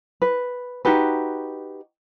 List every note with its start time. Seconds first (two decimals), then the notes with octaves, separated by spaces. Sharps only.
0.22 B4
0.85 D#4 F#4 G4 B4